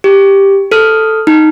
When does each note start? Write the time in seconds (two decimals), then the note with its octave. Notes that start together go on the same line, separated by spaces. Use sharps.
0.04 G4
0.72 A4 F6
1.27 D#4